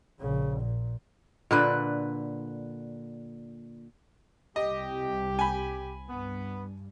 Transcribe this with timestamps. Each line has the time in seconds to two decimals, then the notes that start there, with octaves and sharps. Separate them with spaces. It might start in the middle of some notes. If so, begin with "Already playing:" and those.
0.20 A#1 C#3
0.60 A#2
1.51 A#2 D3 B4
4.56 C2 C3 G4 D#5
5.39 G#5 B5
6.09 G2 B3